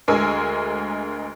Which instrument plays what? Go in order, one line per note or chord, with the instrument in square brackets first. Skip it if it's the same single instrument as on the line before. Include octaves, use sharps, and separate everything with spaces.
[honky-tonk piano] D2 G#3 A#4 G#5 E6